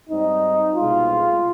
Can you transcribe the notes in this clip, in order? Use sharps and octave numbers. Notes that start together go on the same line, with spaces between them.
G#2 G3 C4 D#4
C2 B2 G#3 F4